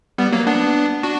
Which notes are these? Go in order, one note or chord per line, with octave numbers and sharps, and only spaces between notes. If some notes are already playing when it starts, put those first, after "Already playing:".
G3 B3
F#3 A#3
B3 D4
D4 F#4